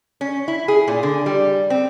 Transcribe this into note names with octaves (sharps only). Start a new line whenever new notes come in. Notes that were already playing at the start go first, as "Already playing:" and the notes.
C#4
E4
G#4
A#2
D3
G3
C4